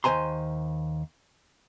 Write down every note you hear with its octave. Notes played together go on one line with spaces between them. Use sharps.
D#2 C5 G#5 A#5 C6